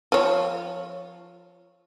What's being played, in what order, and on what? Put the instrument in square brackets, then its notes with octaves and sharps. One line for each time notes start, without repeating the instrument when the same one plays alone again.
[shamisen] F3 C#5